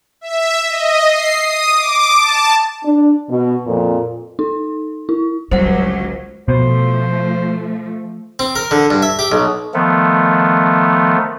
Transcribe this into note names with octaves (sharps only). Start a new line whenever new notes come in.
E5
D#5
C7
D#6
D6
A5
D4
B2
F2 A#2
D#4
E4
G1 C#2 F#3 G3 C5 F#5
B2 F3 A3 C5
C4
A#4
D3
G2
E5
G4
B1
D#3 F3 A3 B3